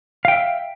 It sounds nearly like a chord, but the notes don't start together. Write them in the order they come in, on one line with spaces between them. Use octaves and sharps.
F5 G5 E5